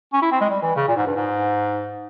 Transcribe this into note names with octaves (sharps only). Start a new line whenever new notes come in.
C#4
E4
C4
G#3
G3
E3
C#3
A#2
G#2
G2
G#2